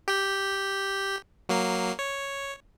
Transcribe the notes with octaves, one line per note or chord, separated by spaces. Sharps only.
G4 G5
F#3 A#3 C7
C#5